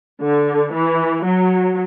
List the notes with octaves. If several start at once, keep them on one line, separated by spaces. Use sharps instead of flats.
D3
E3
F#3